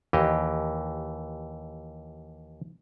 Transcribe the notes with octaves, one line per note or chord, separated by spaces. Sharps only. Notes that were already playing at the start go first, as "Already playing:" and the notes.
D#2 E3 G4 D#5